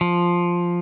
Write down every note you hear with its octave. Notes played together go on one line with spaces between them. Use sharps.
F3